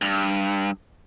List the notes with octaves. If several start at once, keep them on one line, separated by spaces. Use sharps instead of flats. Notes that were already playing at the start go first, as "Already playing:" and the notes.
G2